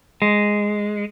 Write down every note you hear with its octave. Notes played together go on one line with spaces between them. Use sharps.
G#3